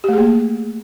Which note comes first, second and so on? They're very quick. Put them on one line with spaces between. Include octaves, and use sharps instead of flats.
G4 A3 G#4 A#3